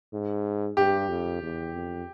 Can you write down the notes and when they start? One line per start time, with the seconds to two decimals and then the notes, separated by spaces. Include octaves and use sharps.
0.13 G#2
0.77 G2 G4
1.09 F2
1.42 E2
1.74 F2